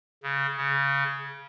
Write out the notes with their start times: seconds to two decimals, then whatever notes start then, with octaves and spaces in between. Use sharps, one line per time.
0.23 C#3
0.57 C#3